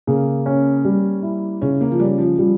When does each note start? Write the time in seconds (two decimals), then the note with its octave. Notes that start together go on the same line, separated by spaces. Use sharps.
0.07 C#3 A#3
0.46 C#4
0.85 G3
1.22 E4
1.62 C#3 C#4
1.81 A#3
1.92 F3
1.99 G3 C#4
2.18 F3
2.39 F3 G3